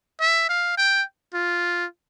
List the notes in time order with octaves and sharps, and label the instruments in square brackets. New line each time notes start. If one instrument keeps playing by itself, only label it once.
[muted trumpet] E5
F5
G5
F4